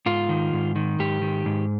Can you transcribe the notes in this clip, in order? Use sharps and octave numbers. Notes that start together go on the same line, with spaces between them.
G#2 F4
D#3
G#2
D#3
G#2 G4
D#3
G#2